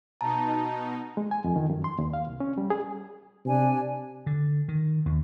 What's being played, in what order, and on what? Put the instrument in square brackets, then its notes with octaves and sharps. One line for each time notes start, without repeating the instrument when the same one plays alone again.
[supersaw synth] B2 D#4 [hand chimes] A5 [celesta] A#5
[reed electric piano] G#3
G#5
F2
D#3
F#2
C6
D#2
F5
C2
C#4
G3
G#4
[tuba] C3 [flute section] D4 G#5
[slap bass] D3
D#3
D#2